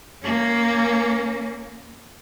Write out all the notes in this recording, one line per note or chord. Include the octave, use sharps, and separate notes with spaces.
A#3 C#4